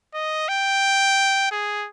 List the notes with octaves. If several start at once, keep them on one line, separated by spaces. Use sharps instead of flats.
D#5
G5
G#4